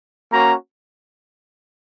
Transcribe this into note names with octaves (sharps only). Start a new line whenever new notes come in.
A#3 C#4 F#4 A#5